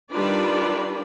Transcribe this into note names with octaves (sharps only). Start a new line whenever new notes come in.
D#3 G3 D4 F4 B4 D5